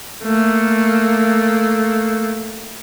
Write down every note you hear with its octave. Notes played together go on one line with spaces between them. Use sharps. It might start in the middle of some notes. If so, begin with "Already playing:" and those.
A3 A#3